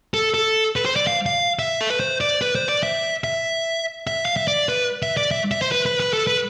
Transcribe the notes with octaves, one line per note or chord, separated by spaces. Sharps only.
A4
A4
B4
C5
D5
F5
F5
E5
A4
B4
C5
D5
B4
C5
D5
E5
E5
E5
F5
E5
D5
B4
E5
D5
E5
E5
C5
B4
B4
B4
A4
B4